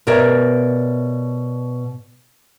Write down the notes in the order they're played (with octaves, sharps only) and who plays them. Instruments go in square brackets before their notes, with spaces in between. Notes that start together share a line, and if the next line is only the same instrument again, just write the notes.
[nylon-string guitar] B2 G4 A#4 C#5 D5 E5